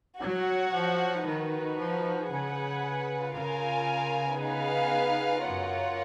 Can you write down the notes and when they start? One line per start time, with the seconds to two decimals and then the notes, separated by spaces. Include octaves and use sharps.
0.21 F#3 F#4 C#5 F#5
0.73 F3
1.25 D#3 D#4 F#4 B4
1.78 F3
2.30 C#3 G#4 B4 F#5
3.35 C#3 F4 A#4 F5 G#5
4.40 B3 D#4 G#4 B4 F5
5.45 F#2 F4 A#4 C#5 F#5